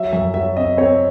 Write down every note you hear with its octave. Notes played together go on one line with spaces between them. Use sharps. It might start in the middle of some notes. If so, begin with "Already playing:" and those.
Already playing: F#3 E5
F#2 E5
F#3 E5
C4 D#5
C4 C#5